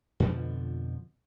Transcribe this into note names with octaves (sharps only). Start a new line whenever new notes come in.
F2 B2 D3 F3